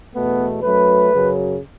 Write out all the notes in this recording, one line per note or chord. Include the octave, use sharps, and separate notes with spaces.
E2 B2 A3 B3
F#2 F#3 A3 B4
F#2 C#3 F#3